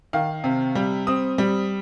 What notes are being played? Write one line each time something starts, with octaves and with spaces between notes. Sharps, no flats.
D#3 F5
C3
G3
C4 D#6
G3